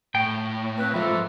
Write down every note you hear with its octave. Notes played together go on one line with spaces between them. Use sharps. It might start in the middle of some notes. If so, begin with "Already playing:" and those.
A2 G5
A#3 C4 B4
G#2 F3 A4 E5 B5